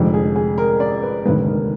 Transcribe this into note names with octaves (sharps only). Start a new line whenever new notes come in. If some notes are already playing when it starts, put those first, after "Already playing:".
Already playing: F1 F2 D3 F3 G#3
G#4
G#4
A#4
D5
B4
F1 D#2 D3 G#3 B4
A#4